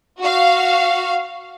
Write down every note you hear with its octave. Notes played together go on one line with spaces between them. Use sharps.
F#4 F5